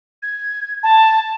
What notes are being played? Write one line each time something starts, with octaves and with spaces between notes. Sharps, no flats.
G#6
A5